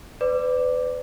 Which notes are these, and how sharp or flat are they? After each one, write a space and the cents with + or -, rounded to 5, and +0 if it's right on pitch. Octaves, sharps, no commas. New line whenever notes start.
B4 +35 D5 +0 D6 +0